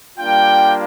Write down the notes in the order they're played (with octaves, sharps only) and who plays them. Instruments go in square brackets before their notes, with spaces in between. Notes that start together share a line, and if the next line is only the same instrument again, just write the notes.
[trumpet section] G3 A#3 D4 F4 G5